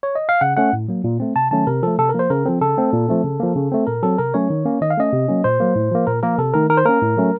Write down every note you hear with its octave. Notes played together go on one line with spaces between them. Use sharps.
C#5
D#5
F5
C#3 F#5
A3 C#4 F#5
A2
F#3 A#3
A#2
A3 C4
C3 A5
D#3 F#3 A3 C#4 A5
C3 A#4
F3 A3 A4
C3 A4
A#4
F3 A#3 C5
C#3 A#4
F3 C4 A4
C#3 A4
A3 C4
A#2
F3 A3 C4
C#3
F3 A#3
C#3
A3 C4
A#2 A#4
F#3 C4 A4
C3 A#4
F#3 A3 C#4 C#5
D#3
A#3 C#4
D#3 D#5
F5
A3 C#4 D#5
C3
F#3 A#3 C#4
A#2 C5
F#3 A#3
A2
F3 A#3
A#2 A#4
F3 A#3 A#4
C3 A4
D#3 A3 A#4
D#3 A#4
C5
A#3 C#4 A#4
A2
F#3 A3 C#4